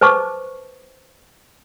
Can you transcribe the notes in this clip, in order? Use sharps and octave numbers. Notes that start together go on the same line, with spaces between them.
B4 C5 A5 C#6 D6